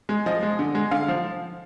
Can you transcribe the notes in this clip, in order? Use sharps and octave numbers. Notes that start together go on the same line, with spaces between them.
G#3
F3 D#5
G#3
D3
G#3
D3 F5
F3